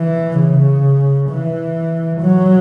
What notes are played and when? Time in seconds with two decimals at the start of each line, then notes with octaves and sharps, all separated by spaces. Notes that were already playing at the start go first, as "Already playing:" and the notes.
Already playing: E3
0.39 C#3
1.30 E3
2.21 F#3